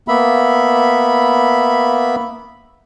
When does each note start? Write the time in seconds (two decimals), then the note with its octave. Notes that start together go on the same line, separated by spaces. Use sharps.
0.08 A#3 B3 E5 B5